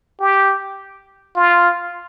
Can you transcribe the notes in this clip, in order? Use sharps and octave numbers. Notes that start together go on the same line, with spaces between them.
G4
F4